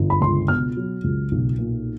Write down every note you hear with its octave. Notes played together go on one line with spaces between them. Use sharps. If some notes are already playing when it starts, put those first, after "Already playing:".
Already playing: G1
B5
C#2 C6
B2 F6
F#3
C#2
B1
A#2